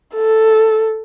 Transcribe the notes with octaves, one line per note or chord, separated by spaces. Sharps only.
A4